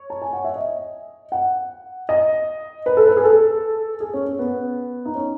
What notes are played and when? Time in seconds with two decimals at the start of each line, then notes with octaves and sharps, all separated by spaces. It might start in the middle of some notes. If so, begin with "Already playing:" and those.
Already playing: C#5
0.10 A5
0.22 G#5
0.33 F#5
0.44 E5
0.56 D#5
1.32 F#5
2.09 D#5
2.86 B4
2.97 A4
3.07 B4
3.17 G#4
3.24 A4
4.00 G#4
4.14 C#4
4.26 C#4
4.39 B3
5.05 D#4
5.15 C#4